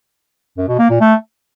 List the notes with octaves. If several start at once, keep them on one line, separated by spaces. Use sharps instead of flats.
F#2
B2
A#3
A#2
A3